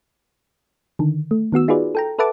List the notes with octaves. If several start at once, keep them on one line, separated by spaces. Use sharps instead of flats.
D3 D#3
A3
D#3 B3 F#4 E6
D#4 F4 F#4 G#4 B4 D5
A4 G5 A#5
A4 B4 E5 F#5 A5 D6